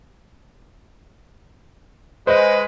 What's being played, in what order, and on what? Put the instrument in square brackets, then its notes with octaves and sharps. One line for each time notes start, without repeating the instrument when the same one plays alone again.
[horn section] G#3 B4 [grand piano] C5 D#5